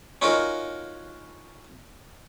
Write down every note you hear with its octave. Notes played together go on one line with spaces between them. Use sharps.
C#4 D#4 F4 F#4 A#4